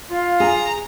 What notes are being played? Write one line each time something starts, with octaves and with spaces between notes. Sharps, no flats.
F4 F5
G#4 A#5